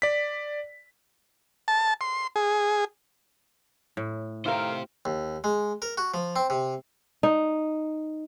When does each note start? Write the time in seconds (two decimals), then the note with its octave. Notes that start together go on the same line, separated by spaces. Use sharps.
0.02 D5 B6
1.68 A5
2.01 C6
2.36 G#4
3.97 A2
4.46 D#3 A3 E4 G4 A#4 C5 F5
5.05 D#2
5.44 G#3
5.82 A#4
5.98 F#4
6.14 F3
6.36 C4
6.50 C3
7.23 D#4